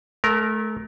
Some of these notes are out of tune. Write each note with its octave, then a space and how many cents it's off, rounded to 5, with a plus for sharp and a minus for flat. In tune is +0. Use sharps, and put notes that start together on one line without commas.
A3 -30 A#4 +0